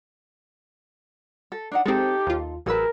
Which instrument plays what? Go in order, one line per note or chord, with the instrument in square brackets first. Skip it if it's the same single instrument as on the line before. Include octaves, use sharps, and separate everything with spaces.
[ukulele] A4
D4 D#4 F#5
[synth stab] G#3 C4 [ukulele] D#4 A4 [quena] G4
[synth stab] D#2 F4
[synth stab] A1 F#3 E6 [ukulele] G#4 B4 [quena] A#4